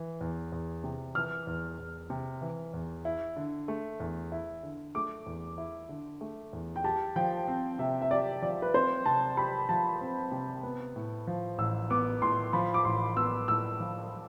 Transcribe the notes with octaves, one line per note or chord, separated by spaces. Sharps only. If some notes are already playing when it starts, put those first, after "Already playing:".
Already playing: E3
E2
E2
C3
E3 F6
E2
E2
C3
E3
E2
E4
D3
A3
E2
E4
D3
A3 D6
E2
E4
D3
A3
E2
G5
G4 A5
F3 G5
C4
C3 E5
E5
G4 D5
F3 D5
B4
C4 C5
C3 A5
G4 B5
F3 A5
C4
C3
B3
A2
F3
A1 E6
B3 D6
A2 C6
F3 B5
D6
A1 C6
B3 E6
A2 E6
F3